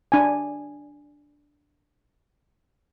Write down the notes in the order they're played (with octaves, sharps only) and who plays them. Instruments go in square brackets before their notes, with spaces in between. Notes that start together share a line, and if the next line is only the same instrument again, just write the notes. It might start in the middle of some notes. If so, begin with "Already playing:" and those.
[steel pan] D4 G#5